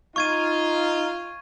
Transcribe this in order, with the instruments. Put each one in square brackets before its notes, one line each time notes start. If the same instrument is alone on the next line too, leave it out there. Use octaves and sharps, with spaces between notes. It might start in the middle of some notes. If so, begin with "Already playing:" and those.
[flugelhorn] D#4 [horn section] F4 [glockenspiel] C#6 G#6 D#7